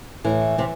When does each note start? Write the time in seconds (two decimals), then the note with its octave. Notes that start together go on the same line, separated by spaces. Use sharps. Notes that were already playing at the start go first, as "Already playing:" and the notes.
0.24 A2 E3
0.58 C3 C4